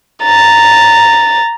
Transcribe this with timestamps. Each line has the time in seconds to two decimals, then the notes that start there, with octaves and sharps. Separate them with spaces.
0.24 A#5 A6